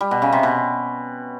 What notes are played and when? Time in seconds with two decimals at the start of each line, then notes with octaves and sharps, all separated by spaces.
0.01 G3
0.11 B2
0.22 C#3
0.33 C3
0.43 B2